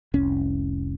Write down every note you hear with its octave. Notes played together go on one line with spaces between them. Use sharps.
F1 C2 C#4